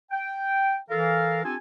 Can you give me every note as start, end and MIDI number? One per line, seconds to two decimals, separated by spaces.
0.11 0.76 79
0.89 1.41 52
0.89 1.41 69
0.89 1.41 70
0.89 1.41 77
1.44 1.55 60
1.44 1.55 62
1.44 1.55 65
1.44 1.55 67
1.44 1.55 69
1.44 1.55 80